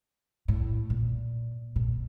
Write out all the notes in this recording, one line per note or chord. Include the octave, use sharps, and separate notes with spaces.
A2
A#2
A#2